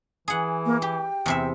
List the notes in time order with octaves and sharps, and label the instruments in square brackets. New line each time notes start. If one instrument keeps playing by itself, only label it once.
[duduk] E3 [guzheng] G#4 F#5
[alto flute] A#3
[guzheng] G4 [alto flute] G5
[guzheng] E2 C3 E5